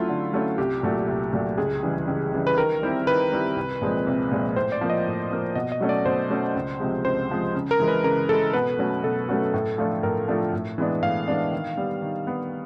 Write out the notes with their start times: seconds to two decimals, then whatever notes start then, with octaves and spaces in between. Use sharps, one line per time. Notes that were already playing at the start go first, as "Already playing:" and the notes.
Already playing: F#3 A3 C#4 E4 F4
0.09 D3
0.33 F#3 A3 C#4 E4
0.58 C2 G4
0.83 A#2 F#3 A3
1.08 C2
1.33 A#2 F#3 A3
1.58 C#2 G#4
1.83 C#3 E3 G3
2.08 C#2
2.32 C#3 E3 G3
2.47 B4
2.57 D#3 A#4
2.82 G3 C4 E4 G4
3.07 D#3 B4
3.32 G3 C4 E4 G4
3.56 C2
3.81 A#2 F3 G#3 C4
4.07 C2
4.31 A#2 F3 G#3 C4
4.56 A2 C5
4.72 D5
4.81 F3 A#3
4.90 D#5
5.06 A2
5.31 F3 A#3
5.55 B2 D#5
5.72 D#5
5.81 F#3 A3 C#4
5.89 D5
6.05 B2 C5
6.30 F#3 A3 C#4
6.55 C#2
6.80 C3 F3 G#3
7.05 C#2 C5
7.30 C3 F3 G#3
7.55 C#3
7.71 A#4
7.80 E3 G#3
7.88 B4
8.04 C#3 A#4
8.29 E3 G#3 A4
8.53 B2 B4
8.79 F#3 A3 C#4 F#4
9.04 B2 A4
9.29 F#3 A3 C#4 F#4
9.54 A2
9.78 F3 A3 D4 F4
10.03 A2 A#4
10.28 F3 A3 D4 F4
10.53 A2
10.78 E3 G#3 B3 D4
11.03 A2 F5
11.28 E3 G#3 B3 D4
11.53 D#3
11.77 G3 B3
12.02 D#3
12.27 G3 B3